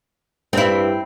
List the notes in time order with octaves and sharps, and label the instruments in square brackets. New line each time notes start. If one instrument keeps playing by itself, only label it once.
[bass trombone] G2 [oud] C4 E4